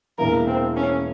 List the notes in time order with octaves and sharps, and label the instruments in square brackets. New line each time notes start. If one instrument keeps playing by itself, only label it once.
[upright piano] E1 E2 E3 A#3 E4 [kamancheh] A#4
[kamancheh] C4
C#4